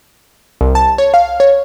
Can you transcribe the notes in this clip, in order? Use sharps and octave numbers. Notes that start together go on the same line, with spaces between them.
C2
A5
C#5
F5
C#5